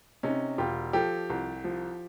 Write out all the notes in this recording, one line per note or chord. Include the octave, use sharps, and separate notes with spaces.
C3 C#4 D#4
E1 F4 G4
F3 G4 A4
C2
F3